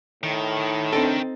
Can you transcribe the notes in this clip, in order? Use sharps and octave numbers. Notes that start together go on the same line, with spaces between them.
A2 D#3
D3 C4 D#4 A4 A#4 G5